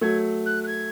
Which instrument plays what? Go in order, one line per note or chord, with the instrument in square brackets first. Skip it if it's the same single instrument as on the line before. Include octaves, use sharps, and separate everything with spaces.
[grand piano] F#3 A3 [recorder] G#6
[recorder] F#6
F#6
G#6